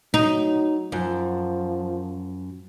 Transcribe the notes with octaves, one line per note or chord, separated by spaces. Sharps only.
F#3 D#4
F#2 F3